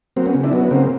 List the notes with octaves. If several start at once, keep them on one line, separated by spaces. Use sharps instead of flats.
F#3 A#3 C4
B3 C#4
C#3
D4 E4
F#3 B3
C#3 A#3 C4